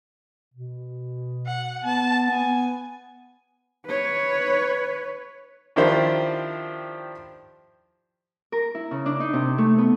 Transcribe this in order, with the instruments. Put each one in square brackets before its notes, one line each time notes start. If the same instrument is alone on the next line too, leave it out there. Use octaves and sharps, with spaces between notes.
[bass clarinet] B2
[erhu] F#5
[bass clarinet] B3 [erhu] A5
[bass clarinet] B3 [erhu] G#5
[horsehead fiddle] B4 C#5
[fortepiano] D#3 F3 D4 E4 G4 C5
[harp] A#4
E4
C#3
D4
D#4
C3
A3
B3